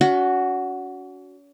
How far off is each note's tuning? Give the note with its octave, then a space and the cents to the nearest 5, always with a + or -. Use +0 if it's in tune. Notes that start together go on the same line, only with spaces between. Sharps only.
C#4 +40 F#4 +0